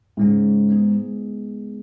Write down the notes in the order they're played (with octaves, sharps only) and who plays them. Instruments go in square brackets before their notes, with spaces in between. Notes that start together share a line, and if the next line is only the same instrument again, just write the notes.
[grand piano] G#2 [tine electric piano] C#3 G#3 C#4
[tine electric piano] G#3 B3 D#4 G#4